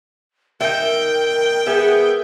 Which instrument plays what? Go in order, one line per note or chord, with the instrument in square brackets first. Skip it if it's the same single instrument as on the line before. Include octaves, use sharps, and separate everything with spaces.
[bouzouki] D#4 E5 [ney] A#4 [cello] G5
[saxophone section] B3 G#4 [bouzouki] E5